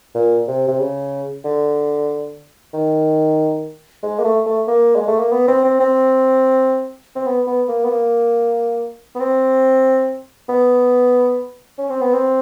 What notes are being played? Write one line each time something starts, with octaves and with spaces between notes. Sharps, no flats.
A#2
C3
C3
C#3
D3
D#3
G#3
A#3
A3
A3
A#3
G#3
A3
A#3
B3
C4
C4
C4
C4
B3
B3
A#3
B3
A#3
B3
C4
B3
C#4
C4
B3
C4